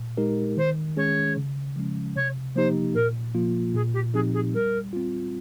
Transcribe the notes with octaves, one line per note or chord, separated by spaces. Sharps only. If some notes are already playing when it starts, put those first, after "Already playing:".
Already playing: A#2
G#3 D#4 G4 A#4
D#3 C5
G#3 C#4 G#4 C#5
C#3
F3 G#3 C#4
C3 C#5
F3 A#3 D#4 G4 C5
A#2 A#4
F3 A#3 F4
A#2 G#4
G4
F3 C4 D#4 G4 G#4
G#4
G3 A#4
C4 F4